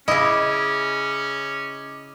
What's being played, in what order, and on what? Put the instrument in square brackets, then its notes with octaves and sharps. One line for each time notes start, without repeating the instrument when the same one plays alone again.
[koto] C#3 E4 [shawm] C#4 [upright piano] D#5 [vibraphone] D6